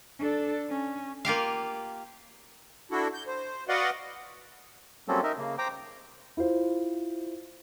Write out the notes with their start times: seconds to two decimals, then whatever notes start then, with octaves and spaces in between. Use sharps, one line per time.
0.19 D4 A4
0.69 C#4
1.25 A#3 F4 G4 F5
2.91 D4 E4 F#4 A4
3.14 G6
3.27 C5
3.69 F#4 B4 D5 D#5 F5 F#5
5.08 F#3 G3 A#3 C4 C#4 A4
5.23 D#4 A#4 D#5 E5
5.38 C#3 A#3
5.58 C5 G5 A#5 D6
6.37 E4 F4 C5